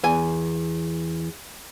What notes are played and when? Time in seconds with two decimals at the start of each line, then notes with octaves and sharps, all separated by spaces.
0.04 E2 G#5